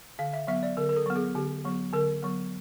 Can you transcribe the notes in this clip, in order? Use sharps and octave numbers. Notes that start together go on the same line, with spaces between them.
D3 F5
E5
F#3 B3 E5
D5
D3 A#4
A#4
A4
F#3 B3
G#4
D3 G4
F#3 B3
D3 A#4
F#3 B3